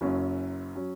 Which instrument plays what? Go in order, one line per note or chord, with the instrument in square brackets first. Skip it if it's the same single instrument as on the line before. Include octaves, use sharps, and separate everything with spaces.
[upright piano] F#1 F#2 F#3 C#4
F#3 C#4